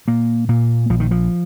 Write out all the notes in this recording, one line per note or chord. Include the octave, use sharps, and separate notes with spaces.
A#2 A#3
A#2 A#3
A#1 F3
D#3
F3